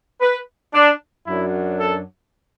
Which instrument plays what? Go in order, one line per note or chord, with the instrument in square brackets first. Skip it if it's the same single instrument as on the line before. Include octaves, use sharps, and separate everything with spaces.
[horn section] B4
D4
F#2 F#3 D4 E4
A4